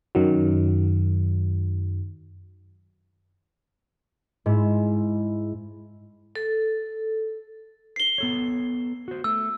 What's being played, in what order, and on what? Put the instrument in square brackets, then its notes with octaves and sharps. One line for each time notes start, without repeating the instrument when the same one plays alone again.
[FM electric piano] F#2 D#3 F#3
[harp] G#2 E4
[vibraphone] A4
[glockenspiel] C7 G7
[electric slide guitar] B3 A4 C#5
F#4 C5
[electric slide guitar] A3 [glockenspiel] E6